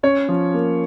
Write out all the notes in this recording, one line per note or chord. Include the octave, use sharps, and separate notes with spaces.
C#4 C#5
F3
A#3